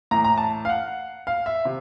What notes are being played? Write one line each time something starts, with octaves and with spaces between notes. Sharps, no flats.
A2 E3 A#5
A#5
A5
F5
F#5
F5
E5
C3